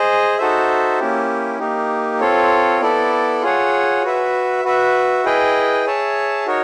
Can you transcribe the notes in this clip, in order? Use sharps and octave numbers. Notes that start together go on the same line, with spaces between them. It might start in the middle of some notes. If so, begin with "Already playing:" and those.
Already playing: G#4 C5 D#5
D#4 F#4 A4 C5 E5
A#3 C#4 E4 G4
A#3 D#4 G4
C4 F4 A4 C#5
B3 E4 A4 D5
F4 G#4 C#5 F#5
F#4 B4 E5
F#4 B4 E5
E4 G#4 B4 D#5 G5
G#4 C#5 E5 A5
D#4 F#4 A#4 C#5